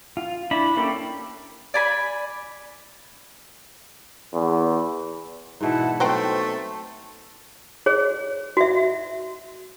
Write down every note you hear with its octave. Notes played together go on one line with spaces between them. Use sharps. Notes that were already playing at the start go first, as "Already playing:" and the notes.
F4
D4 E4 B5
A#3 C#4 G4 A4
D5 G#5 B5
E2
G#2 B2 E3 E4 F#5 A5
F#3 A3 C4 B4 C5 D#5 C6
G#4 C#5
F#4 E5